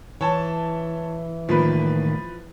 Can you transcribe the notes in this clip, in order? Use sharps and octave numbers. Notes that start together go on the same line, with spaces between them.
E3 C#5 A5
A2 D#3 F3 A#3 B4